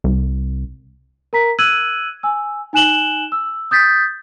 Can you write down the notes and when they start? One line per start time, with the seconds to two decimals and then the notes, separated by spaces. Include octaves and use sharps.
0.04 C2
1.33 A#4 A#5 B6
1.59 E6 F#6 G#6 D#7 F#7
2.23 G#5 E6
2.73 D#4 G#5 F#6 E7 F#7 G7
3.32 E6
3.71 D#6 G6 A6 B6